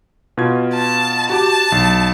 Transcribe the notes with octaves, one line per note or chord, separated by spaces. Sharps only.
B2 F4 G#6
A5
F#4 G4 A5 D6
B1